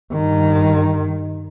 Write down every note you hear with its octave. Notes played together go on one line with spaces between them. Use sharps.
G2 D#3